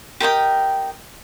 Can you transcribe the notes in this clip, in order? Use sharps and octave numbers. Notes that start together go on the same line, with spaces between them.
G4 A#4 D#5 G5